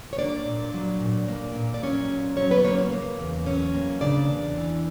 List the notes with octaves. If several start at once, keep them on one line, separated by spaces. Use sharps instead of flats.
C#5
A#3 D4 D5
A#2
F#3
A#2
A#3
A#2
D5
F#3 C#4 C#5
A#2
F#3 C#4 C#5
B3 B4
D5
A#3 C#4 C#5
B3 B4
C#3 A#3 A#4
E2
F#3 C#4 C#5
A#3
C#3 D4 D5
E2
E3